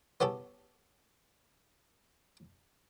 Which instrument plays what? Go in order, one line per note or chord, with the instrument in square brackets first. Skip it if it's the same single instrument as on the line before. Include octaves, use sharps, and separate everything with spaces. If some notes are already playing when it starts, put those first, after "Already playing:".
[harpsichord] B3 C#4 G4 A4